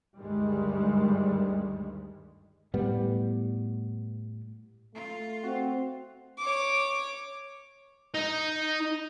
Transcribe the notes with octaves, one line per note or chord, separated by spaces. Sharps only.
D2 G2 D#3 G3 G#3
A2 G3 B3
A3 F4
C4 F#4
C#5 D6
D#4